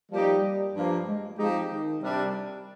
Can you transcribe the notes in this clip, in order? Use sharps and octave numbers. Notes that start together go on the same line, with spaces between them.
F3 G3 A#3 D#4 G4
G2 F3 A#3
G#3
F3 G#3 C4 D#4 G4
D#3
C3 G3 D4